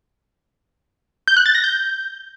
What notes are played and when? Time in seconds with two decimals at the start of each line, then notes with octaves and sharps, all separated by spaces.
1.28 G6
1.37 F#6
1.46 A6
1.55 A#6
1.64 G6